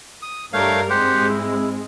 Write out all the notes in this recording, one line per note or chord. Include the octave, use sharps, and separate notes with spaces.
D#6
G2 G3 A3 A#4 C#5 F5
G#2 G#3 C4 G4 C5 F#5
E4